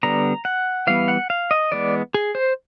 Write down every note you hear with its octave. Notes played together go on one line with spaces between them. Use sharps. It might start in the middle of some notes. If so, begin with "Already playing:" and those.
D3 G3 B3 A#5
F#5
E3 G3 B3 F5
F#5
F5
D#5
E3 G#3 B3 D5
G#4
C5